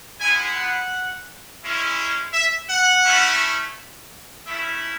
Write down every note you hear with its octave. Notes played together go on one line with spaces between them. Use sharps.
G#3 B3 E4 G#5
F#5
G#3 C#4 E4
E5
F#5
A3 C#4 E4
A3 C#4 E4 E5